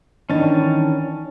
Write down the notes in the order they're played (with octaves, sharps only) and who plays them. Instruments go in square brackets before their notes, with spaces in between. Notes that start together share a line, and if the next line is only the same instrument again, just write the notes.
[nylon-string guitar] D#3 E3 D4 [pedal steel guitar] C#4 A5